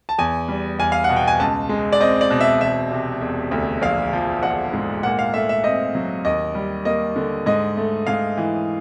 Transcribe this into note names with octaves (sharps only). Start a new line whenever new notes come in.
A5
E2 G#5
G3
E2 G#5
F5
B2 F#5
G5
G#5
C#2 A5
G#3
D5
C4 D#5
D5
B2
E5
E1 E5
C3
E1
D2
A#1 F5
F3
A#1 F#5
G#2
A#2 F#5
F5
A3 E5
E5
C4 D#5
F#3
D#2 D#5
G3
A#3 D#5
D3
G#2 D#5
A3
G#2 F5
E3